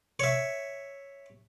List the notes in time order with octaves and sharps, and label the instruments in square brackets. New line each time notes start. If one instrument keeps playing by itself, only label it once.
[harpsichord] C#5 E5